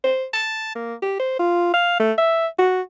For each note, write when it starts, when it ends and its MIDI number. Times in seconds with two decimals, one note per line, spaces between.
0.04 0.26 72
0.33 0.72 81
0.75 0.94 58
1.02 1.18 67
1.20 1.36 72
1.39 1.72 65
1.74 1.95 77
2.00 2.12 57
2.18 2.47 76
2.59 2.81 66